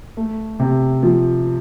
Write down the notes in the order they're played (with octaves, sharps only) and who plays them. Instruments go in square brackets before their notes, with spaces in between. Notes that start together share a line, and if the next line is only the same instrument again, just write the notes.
[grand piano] A3
C3
F3